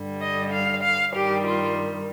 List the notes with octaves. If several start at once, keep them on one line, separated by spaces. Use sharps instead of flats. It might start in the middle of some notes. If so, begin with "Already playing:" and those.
Already playing: G2 D3 G3
D#5
F5
F5
G2 D#3 G3 G4
F4